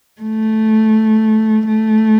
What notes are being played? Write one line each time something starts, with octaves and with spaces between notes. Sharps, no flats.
A3
A3